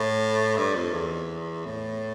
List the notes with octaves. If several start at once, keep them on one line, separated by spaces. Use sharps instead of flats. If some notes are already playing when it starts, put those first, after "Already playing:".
Already playing: A2
G2
F2
E2
A2